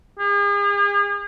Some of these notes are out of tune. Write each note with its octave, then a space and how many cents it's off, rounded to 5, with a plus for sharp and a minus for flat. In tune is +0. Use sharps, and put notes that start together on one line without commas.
G#4 -45